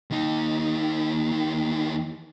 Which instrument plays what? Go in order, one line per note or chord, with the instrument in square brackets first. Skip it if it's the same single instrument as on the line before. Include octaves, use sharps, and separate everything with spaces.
[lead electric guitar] D#2 D#4